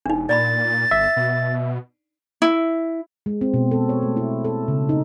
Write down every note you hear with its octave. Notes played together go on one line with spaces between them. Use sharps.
E1 D4 D#4
A#2 D5 A#5 B5 A6
G1 E5
B2
E4
G#3
C4
B2
A4
C#5
A3
E4
A4
C#3
D#4